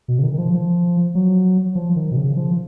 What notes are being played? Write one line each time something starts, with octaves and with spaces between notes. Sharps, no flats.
B2
C#3
D#3
D#3
F3
F3
F#3
F3
D#3
B2
C#3
F3